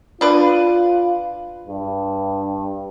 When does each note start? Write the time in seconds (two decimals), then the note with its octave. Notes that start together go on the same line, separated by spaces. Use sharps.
0.21 D4 F4 B4
1.68 G2